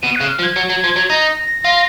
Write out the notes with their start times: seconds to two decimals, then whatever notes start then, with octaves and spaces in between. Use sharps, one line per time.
0.02 B2 D#7
0.16 C#3 F#6
0.29 F6
0.39 F3
0.43 G#6
0.56 F#3
0.69 F#3
0.84 F3
0.96 F#3
1.10 D#4 A#6
1.64 F4